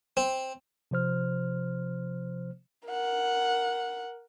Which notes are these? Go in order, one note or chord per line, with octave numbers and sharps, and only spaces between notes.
C4
C3 F3 C5 F6
A#4 F#5